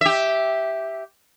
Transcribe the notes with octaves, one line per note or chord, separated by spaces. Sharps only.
G4 E5